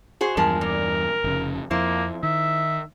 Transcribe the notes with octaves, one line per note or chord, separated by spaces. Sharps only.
F#4 G#4 C5
E2 G2 F3 G#3 A#4
A#2 A#4
F1 C#3
F2 A#3 E4 C5
D#3 E5